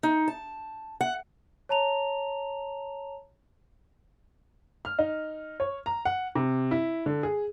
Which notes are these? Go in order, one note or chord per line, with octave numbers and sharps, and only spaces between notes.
D#4
A5
F#5
C#5 A5 A#5 F7
F6
D#4
C#5
A#5
F#5
C3
E4
D3
G#4